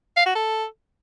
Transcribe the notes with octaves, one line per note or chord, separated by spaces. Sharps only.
F5
F#4
A4